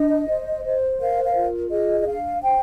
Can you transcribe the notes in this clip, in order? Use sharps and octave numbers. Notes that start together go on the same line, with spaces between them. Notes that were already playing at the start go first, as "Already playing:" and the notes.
Already playing: D4 D#5
C5
C5
A#4 F5
F5
F4
G#4 D#5
D#5
D4 F5
C5 G5